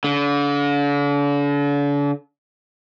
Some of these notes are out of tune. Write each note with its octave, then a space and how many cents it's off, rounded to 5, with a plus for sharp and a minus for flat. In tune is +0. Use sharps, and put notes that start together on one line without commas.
D3 -40